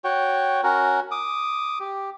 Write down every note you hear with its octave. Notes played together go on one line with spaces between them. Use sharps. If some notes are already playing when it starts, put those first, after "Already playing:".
F#4 C#5 G5
C#4 F#4 A#4
D6 D#6
G4